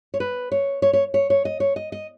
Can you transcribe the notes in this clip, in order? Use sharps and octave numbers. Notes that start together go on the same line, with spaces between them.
C#5
B4
C#5
C#5
C#5
C#5
C#5
D#5
C#5
D#5
D#5